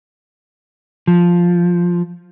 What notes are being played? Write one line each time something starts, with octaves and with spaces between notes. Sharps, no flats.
F3